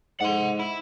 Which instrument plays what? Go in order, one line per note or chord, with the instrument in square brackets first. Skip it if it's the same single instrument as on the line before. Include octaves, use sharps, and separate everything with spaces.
[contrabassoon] G#2 [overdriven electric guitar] F#5 C6
[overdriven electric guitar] E4